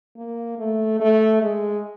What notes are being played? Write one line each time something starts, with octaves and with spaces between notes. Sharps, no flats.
A#3
A3
A3
G#3